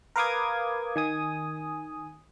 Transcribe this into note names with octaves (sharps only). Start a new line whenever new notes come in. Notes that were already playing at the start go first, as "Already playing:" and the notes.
A#4 B4 F5 D6 D#6 G#6
D#3 G#5 D#6